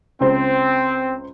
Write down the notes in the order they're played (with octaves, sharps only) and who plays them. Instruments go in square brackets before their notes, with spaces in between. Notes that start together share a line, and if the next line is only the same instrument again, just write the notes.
[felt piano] C#2 C5 [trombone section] C4